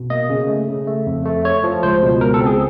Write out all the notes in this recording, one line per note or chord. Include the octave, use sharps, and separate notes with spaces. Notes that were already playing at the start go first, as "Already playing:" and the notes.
Already playing: B2
A#3 D#5
C#3
A3
C#3
A3
F2
A3
A3 C#5
F3
C#2 C5
B2
C#2 A#4
A4
C4
G#4